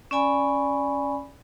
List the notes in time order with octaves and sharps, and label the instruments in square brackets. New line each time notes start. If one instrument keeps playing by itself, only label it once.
[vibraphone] C#4 D5 G#5 B5